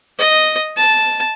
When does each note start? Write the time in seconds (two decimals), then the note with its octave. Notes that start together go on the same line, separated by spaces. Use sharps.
0.18 D#5
0.77 A5